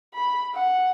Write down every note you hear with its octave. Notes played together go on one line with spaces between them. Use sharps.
B5
F#5